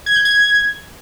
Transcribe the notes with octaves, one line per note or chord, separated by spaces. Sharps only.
G#6
G6
G#6